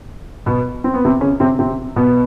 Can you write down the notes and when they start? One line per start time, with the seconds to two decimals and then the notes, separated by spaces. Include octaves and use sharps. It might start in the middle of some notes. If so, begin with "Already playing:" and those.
0.46 B2 B3
0.84 C4
0.94 B3
1.05 C3 C4
1.21 C#3 C#4
1.40 C3 C4
1.59 C3 C4
1.96 B2 B3